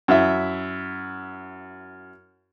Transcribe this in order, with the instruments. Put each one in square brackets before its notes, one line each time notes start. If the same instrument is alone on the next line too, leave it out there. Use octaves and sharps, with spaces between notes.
[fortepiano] F#2 E4 E5